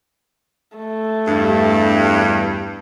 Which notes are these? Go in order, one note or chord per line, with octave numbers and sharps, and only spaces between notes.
A3
E2 G2